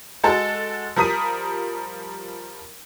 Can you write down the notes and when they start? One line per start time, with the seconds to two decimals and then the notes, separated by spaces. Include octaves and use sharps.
0.24 G#3 F#4 A4
0.96 F3 G3 A#4 D#6 B6 D#7